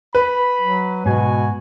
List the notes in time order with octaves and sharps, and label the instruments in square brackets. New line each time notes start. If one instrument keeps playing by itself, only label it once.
[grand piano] B4 [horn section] B5
[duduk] F#3
[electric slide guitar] G#2 [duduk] B2 [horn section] F#4 G#5